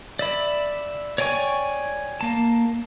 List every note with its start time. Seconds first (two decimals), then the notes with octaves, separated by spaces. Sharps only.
0.19 D5 E5 B5
1.18 C#5 D5 G5 G#5 C#6
2.21 A#3 A5